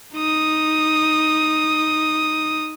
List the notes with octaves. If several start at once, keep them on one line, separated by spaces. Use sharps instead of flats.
D#4 D#6